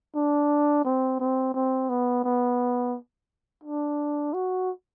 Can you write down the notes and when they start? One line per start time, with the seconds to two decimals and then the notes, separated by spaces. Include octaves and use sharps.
0.15 D4
0.85 C4
1.20 C4
1.54 C4
1.89 B3
2.24 B3
3.64 D4
4.34 F#4